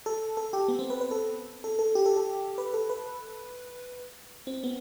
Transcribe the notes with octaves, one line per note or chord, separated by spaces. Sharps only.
A4
A4
G4
B3
C4
B4
B4
A4
A4
A4
G4
A4
A4
B4
A4
B4
C4
B3